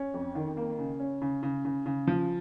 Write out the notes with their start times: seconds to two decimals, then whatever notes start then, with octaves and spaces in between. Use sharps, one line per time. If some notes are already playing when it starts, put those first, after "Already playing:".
Already playing: C#4
0.14 F2
0.35 D#3
0.57 A#3
0.79 C#3
0.99 C#4
1.22 C#3
1.43 C#3
1.65 C#3
1.86 C#3
2.07 F3